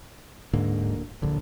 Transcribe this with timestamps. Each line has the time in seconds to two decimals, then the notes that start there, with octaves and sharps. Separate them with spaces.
0.53 D1 G#2 D3 A#3
1.22 D1 A#1 D3